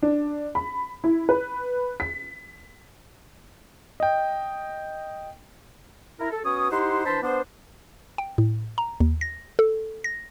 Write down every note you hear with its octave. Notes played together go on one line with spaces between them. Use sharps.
D4
B5
E4
B4
B6
D#5 G5
E4 A#4
A4
B3 C#4 F#4 C#5 D#6
D#4 E4 G4 C5 F#5 C6
E3 D4 C5 A5 B5 C6
B3 D4 C5
G5
A2
A#5
D#2
A#6
A4
A#6